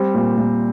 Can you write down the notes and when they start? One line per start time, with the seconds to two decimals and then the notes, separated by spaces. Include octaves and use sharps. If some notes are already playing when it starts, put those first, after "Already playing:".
Already playing: G3 C4
0.14 A#2
0.38 A#2